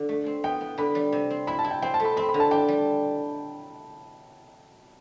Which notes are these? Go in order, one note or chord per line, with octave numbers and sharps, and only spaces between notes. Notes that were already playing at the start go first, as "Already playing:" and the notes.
Already playing: D3
A3
C4
B3 G5
B3
D3 B5
G3
C3
C4
E4 B5
A5
E4
G5
C4 G5
A5
A3
B5
C4 B5
B5
D3
A5
D4 G5
G3